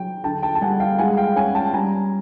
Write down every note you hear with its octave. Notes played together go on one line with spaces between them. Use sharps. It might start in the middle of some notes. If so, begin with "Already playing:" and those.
Already playing: F#3 G5
D3 G5 A5
G5 A5
A5
G3 F#5 G#5
F5 G5
G#3 F#5 G#5
F5 G5
C#4 F#5 G#5
G5 A5
G3 G#5 A#5